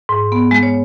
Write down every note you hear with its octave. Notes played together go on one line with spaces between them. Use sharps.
G#2
B3
G#3
C#5